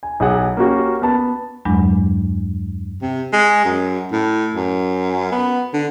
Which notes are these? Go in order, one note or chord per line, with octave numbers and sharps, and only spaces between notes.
G#5
B1 G#4 F#5
A#3 C#4 F#4 G4
B3 A5
E2 G2 F#3 G#3 D4
C3
G#3
F#2
A2
F#2
B3
D3